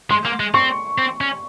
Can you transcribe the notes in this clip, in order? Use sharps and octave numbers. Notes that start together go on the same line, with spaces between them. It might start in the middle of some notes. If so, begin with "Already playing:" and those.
G#3 C6
A#3
G#3
C4 C#6
C4
C#4